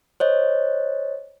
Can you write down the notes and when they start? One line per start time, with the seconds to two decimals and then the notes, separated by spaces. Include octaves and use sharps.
0.20 C5 C#5 D#5